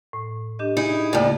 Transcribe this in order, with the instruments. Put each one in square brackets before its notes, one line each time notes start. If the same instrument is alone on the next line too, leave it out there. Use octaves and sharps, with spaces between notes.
[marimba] A2
D4 G4 D#5
[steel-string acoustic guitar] D#4 E4 G#4
[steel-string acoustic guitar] D2 A2 [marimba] C#3 A3 A#3